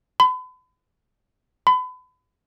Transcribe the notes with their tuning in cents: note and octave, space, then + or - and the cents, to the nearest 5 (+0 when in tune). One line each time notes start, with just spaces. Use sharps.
B5 +40
B5 +35